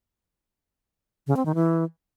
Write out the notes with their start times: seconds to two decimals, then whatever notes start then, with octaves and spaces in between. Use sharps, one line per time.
1.27 C#3
1.36 C4
1.46 D#3
1.55 E3